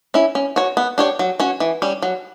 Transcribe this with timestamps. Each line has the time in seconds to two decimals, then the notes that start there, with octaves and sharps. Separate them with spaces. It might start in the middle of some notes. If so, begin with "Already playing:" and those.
0.14 C#4 E4
0.35 C#4
0.56 F#4 C#5
0.77 B3
0.98 D4 G4 C#5
1.19 F#3
1.40 C#4 F#4 C#5
1.60 E3
1.82 G3 C#4
2.03 F#3